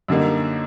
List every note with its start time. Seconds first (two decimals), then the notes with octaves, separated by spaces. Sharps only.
0.08 F#2 D3 G3 A#3 D#4